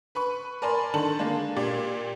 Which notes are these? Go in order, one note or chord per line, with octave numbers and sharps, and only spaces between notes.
B4 B5 C#6
A#4 D5 G#5 A5 B5 C6
D3 D#3 A4 A5 F#7
G#3 A#3 D4
A#2 G4 D5